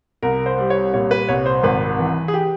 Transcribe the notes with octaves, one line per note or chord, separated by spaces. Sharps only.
C2 A#4
C5
G3
C#5
A#2 C#5
B4
C2 C#5
C5
G#1 B4
E3
G#4
G4